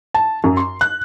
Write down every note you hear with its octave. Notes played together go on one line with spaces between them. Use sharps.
A5
F#2
C6
F#6